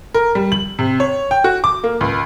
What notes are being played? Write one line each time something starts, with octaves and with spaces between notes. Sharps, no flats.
A#4
G3
F#7
C3
C#5
G5
F#4
D6
A#3
C#2